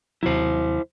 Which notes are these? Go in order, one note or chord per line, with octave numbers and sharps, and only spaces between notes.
D#2 C3 F#3 E4 C5